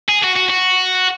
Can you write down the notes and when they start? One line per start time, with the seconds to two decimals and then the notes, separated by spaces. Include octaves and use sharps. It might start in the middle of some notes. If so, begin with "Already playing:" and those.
0.09 G#4
0.24 F#4
0.36 F#4
0.50 F#4